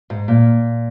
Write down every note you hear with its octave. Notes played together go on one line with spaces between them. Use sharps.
G#2
A#2